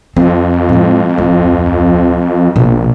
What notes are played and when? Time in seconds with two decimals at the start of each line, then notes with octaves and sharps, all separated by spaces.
0.16 F2 C4
0.69 A2 G#3
1.18 D1
2.56 A#1 B2